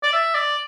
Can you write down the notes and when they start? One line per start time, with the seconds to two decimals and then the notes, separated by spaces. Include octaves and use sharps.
0.03 D5
0.13 E5
0.35 D5